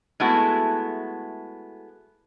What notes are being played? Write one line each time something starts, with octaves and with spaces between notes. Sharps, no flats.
G#3 A3 B3 E4 F#4